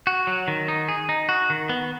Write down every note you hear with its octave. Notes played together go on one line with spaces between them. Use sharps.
F#4
F#3
D#3
D#4
G#4
D#4
F#4
D#3
B3